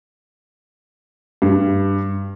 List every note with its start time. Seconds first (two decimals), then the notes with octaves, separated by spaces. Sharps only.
1.42 G2